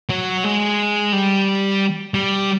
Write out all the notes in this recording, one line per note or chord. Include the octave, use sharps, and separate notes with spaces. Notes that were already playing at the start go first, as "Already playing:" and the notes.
F#3
G#3
G3
G3